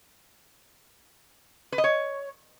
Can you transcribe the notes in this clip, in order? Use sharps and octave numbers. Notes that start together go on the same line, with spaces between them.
B4
D#5
C#5